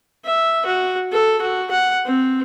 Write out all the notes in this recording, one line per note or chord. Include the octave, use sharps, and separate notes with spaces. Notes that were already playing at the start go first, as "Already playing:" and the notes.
E5
F#4
A4
F#4
F#5
C4